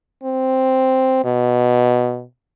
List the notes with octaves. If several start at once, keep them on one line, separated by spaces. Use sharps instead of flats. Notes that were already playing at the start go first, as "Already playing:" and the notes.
C4
B2